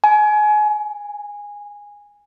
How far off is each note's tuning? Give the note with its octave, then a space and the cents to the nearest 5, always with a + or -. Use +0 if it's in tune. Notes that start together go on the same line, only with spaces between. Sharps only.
G#5 +25
G#5 -15